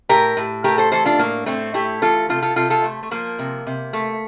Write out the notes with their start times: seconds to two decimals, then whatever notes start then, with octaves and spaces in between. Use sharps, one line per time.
0.09 A2 G4 A#4
0.37 A2
0.64 A3 G4 A#4
0.78 A4 C5
0.92 E3 A4 C5
1.05 D4 F4
1.19 A2 A#3
1.46 A2 A3 C4
1.74 A3 E4 G4
2.02 E3 F4 A4
2.29 C3 F4 A4
2.42 F4 A4
2.56 C3 F4 A4
2.70 F4 A4
2.84 A3
3.03 A3
3.11 F3 A#3
3.39 C3
3.67 C3
3.93 A3